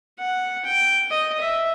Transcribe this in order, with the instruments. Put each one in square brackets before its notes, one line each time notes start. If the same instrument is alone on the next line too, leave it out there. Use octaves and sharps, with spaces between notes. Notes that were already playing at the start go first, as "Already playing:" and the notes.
[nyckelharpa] F#5
G5
D#5
E5